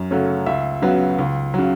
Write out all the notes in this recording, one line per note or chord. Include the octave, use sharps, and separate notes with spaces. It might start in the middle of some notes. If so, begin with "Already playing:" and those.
Already playing: F#2
C#3 F#3 A3 C#4
C#2 E5
C#3 F#3 B3
C#2
C#3 F#3